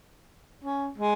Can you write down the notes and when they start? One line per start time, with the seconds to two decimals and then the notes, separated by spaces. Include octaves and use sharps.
0.64 C#4
0.98 G#3